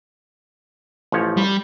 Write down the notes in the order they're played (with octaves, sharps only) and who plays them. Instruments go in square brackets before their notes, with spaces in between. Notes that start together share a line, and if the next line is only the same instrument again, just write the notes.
[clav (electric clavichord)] A1 F3 C#5
[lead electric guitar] G3